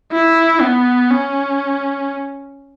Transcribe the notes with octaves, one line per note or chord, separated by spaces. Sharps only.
E4
B3
C#4